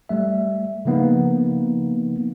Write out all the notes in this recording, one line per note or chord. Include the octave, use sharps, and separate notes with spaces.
G3 A3 E5
C#3 F3 A#3 B3 D#4